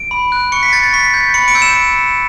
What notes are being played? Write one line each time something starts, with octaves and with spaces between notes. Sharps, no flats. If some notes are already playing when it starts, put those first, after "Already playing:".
Already playing: D7
B5
F#6
C#6 C#7
B6
G6 A6
A6
C#6 B6
G6
B6
B5 C#7
D7
E6 G6
E7